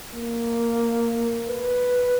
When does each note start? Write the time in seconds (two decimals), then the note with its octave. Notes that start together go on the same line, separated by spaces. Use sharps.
0.15 A#3
1.49 B4